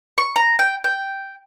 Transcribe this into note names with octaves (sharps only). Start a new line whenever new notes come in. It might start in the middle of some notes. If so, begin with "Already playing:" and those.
C#6
A#5
G5
G5